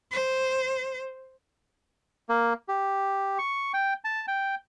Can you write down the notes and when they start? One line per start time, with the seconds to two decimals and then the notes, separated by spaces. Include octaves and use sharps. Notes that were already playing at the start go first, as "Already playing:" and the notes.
0.11 C5
2.29 A#3
2.68 G4
3.39 C#6
3.74 G5
4.04 A5
4.28 G5